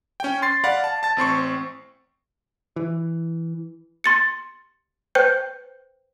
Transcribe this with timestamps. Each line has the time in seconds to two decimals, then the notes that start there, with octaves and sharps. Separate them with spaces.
0.20 C#4 G5
0.42 C6 A6 C7
0.64 D5 F5 F#5 B5
0.84 A5
1.03 A5 A6
1.17 A1 C4 C6 C#6
2.76 E3
4.04 C6 A6 C#7
5.15 B4 C5 G5 G6